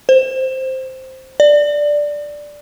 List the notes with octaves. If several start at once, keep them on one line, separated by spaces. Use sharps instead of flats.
C5
D5